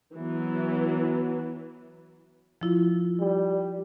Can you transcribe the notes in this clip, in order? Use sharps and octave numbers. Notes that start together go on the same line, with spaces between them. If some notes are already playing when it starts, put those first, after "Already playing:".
E3 F#3 B3
F3 E4 F4
G3